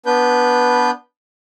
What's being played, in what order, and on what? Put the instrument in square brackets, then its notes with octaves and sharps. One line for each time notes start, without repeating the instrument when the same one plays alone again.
[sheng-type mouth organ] B3 D4 B4 G6